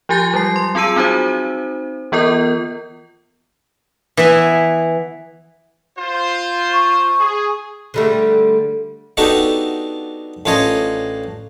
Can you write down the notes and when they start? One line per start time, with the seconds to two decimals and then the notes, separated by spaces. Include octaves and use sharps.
0.09 F3 F4 G4 G#5 G6 A6
0.34 F#3 G3 C7
0.56 C6
0.75 C4 F4 G#4 A5 E6 D#7
0.96 C4 D#4 F#4 C5
2.12 E3 B3 F4 A#4 D#5 G6
4.17 E3 B3 E5 G#5
5.98 F4 C5
6.73 C#6
7.19 G#4
7.94 D3 G3 A3
9.17 B3 D4 D#4 F#4 G4 A4
10.46 A1 D4 F4 C#5 D#5